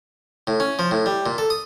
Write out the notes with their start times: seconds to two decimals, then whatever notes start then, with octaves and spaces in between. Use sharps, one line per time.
0.47 A2
0.60 C#4
0.79 F3
0.91 A2
1.06 G3
1.26 A#2
1.38 A4
1.50 D#6